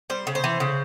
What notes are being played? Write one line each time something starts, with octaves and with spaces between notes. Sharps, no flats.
G3 C5
C#3
C5
E3
C#3